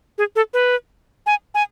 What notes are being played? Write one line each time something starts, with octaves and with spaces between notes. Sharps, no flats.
G#4
A4
B4
G#5
G#5